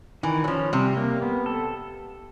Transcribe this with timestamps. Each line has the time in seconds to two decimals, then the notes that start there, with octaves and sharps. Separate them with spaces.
0.23 D#3 E3
0.44 F#3
0.48 F3 C#4
0.73 C3 G3
0.97 A#3
1.22 B3
1.46 A4